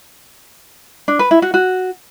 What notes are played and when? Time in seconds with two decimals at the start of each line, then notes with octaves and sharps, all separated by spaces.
1.08 D4
1.19 B4
1.31 E4
1.42 F#4
1.54 F#4